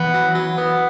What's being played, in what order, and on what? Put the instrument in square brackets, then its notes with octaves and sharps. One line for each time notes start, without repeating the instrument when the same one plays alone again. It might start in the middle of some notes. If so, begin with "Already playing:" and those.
Already playing: [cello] E3 [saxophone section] B3
[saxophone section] F#3
F#3
B3